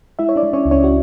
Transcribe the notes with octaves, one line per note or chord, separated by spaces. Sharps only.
G#3 E4 E5
C#5
D4 D5
G#3
C#4 C#5
C#2
C#4 C#5
F#4